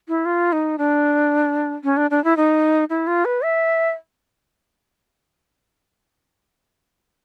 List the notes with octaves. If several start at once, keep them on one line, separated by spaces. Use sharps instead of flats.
E4
F4
D#4
D4
C#4
D4
D4
E4
D#4
E4
F4
B4
E5